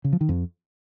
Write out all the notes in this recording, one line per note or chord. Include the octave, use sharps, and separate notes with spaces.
C#3
F3
D#3
F2